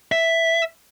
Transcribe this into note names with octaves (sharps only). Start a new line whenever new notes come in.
E5